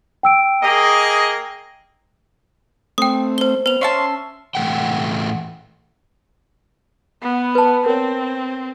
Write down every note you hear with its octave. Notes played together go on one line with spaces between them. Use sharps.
G5 E6 D7
A#3 G#4 D#5
A3 C4 G5 D#6
C5 G7
B3 C5 F7
C#4 E5 A5 C6
A2 E3 A3 F#5 G5
B3
B4 A5
C4 A#4 C#5